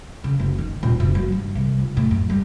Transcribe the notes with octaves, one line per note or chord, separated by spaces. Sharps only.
C#3
F#1
D#3
D#1
F#1
F#3
G2
C2
F1
A2
F#2
G3